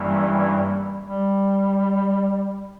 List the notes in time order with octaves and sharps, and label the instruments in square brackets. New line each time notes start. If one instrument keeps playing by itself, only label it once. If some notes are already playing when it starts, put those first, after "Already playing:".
Already playing: [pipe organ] G2 E3 A#3 C#4 E4 [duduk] G3
[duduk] G3